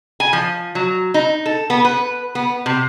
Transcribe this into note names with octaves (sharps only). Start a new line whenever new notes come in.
G#5
F3
F#3
D#4
A4
B3
B4
B3
C3